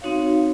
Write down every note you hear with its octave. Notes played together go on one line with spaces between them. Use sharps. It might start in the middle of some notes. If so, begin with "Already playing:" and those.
C4 D#4 F#4 C#5 F5